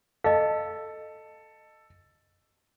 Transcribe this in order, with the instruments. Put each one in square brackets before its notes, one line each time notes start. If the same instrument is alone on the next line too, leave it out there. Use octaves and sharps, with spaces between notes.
[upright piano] A4 [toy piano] D#5 F5